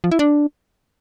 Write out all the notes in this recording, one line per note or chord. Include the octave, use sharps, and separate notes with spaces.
F3
E4
D4